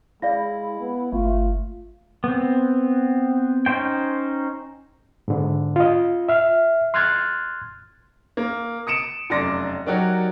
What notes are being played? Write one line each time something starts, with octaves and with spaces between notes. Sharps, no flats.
G#3 E4 D5 F5 A#6
B3
G1 A3 F4
B3 C4
C#4 D#4 C5 G5
G#2 D3
F4 D#5
E5 F6
C6 F6 F#6 G#6 A6
A#3
D#6 C#7 D7 E7
F1 F#2 D5 C6 D6 A#6
F#3 D#4 F#4 G4 A#4 D5